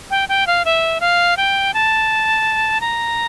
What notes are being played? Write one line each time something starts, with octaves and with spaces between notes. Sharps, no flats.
G5
G5
F5
E5
F5
G5
A5
A#5